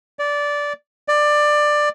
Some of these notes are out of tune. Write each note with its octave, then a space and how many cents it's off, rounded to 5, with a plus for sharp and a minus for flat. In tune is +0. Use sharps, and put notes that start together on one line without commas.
D5 -15
D5 +15